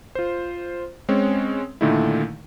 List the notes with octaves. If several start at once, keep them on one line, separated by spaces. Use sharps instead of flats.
F4 C5
G#3 C4 C#4 C#5
A#2 D3 D#3 A3 D#4 E4